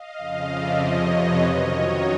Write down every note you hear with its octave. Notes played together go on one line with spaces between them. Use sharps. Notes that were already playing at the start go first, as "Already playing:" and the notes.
Already playing: D#5 F5
F2 C#3 F3
D5 E5
F2 C3 F3 C#5 D#5
B4 C#5
F#2 D#3 F#3 C#5 D#5
C#5 D#5